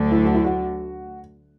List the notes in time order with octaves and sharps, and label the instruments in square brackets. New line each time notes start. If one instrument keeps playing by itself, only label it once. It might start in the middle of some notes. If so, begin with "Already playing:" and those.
Already playing: [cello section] D2 D3 F#3 A3 D4
[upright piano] E4
F#4
E4
F#4